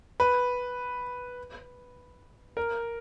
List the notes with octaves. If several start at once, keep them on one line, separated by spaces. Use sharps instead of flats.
B4
A#4